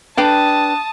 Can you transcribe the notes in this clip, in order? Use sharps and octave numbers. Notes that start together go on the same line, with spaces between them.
D4 B4 G5 A5 D#6